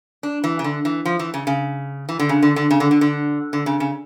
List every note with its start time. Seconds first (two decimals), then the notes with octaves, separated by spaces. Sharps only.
0.23 D4
0.44 E3
0.59 C#3
0.64 D3
0.85 E3
1.05 F3
1.19 E3
1.34 C#3
1.47 C#3
2.09 E3
2.19 D3
2.29 C#3
2.42 D3
2.56 D3
2.71 C#3
2.80 D3
2.91 D3
3.01 D3
3.53 D3
3.66 C#3
3.80 C#3